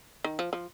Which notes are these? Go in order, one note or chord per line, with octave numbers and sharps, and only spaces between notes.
D#3
F3
F3